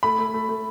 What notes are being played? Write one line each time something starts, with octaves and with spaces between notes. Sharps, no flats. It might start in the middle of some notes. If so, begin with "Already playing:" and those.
A3 B5
A3
A3
A3